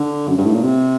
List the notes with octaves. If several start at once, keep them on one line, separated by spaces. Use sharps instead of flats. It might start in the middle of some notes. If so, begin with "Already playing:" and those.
Already playing: D3
F#2
G2
A2
A#2
C3